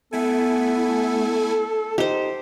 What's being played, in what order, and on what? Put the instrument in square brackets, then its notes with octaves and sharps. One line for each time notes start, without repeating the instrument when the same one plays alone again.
[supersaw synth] A3 E4 G#5 [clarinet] B3 [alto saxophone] A4
[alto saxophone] D#4 [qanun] G4 C5